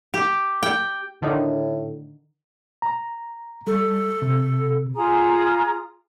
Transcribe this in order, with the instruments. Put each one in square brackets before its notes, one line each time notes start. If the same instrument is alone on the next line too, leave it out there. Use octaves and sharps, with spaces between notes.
[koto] G4
G5
[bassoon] A2 [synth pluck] D3 D#3 D#4
[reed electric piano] A#5
[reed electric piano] G3 [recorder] A4
[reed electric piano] C3
[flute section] F4 G#4 A#5 D#6